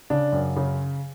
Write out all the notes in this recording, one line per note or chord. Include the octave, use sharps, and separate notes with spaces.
C#3 D4
F#2
C#3